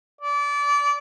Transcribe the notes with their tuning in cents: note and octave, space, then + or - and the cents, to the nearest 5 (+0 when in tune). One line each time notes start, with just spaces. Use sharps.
D5 -25